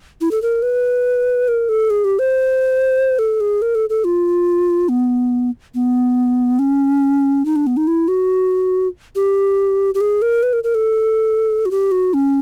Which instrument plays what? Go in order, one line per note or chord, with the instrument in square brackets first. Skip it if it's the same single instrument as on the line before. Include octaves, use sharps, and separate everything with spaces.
[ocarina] E4
A4
A#4
B4
A#4
A4
G#4
G4
C5
A4
G#4
A#4
A4
A4
F4
B3
B3
C#4
D#4
D4
B3
D#4
E4
F#4
G4
G4
G#4
A#4
B4
A#4
A#4
A4
F#4
G4
F#4
C#4